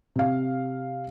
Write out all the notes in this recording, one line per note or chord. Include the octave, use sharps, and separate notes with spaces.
C3 F5